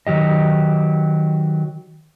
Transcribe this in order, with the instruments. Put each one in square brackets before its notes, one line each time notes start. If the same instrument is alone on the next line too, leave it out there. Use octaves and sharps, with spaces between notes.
[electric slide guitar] D#3 F#3 G4 D#5